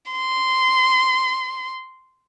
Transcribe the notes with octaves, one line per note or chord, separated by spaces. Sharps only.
C6